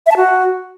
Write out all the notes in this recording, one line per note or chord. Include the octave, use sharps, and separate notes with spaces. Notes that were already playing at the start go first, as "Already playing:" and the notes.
E5
A5
F#4